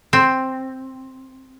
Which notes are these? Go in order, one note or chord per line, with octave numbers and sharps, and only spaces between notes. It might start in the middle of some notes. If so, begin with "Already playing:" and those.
C4